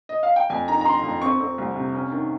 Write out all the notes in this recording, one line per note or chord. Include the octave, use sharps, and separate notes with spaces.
D#5
F5
G5
F2 G#5
D#3 A#5
A#5
D#3 C6
F2
C4 C#6
C4
C2
C3
C#4
D#3